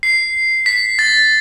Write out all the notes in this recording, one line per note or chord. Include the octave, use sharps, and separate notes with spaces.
C7
B6
A6